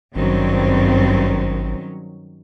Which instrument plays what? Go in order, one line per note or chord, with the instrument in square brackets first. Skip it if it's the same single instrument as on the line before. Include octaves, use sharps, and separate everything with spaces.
[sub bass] G#1 [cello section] G2 C4 [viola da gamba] D#3 F#3 C#4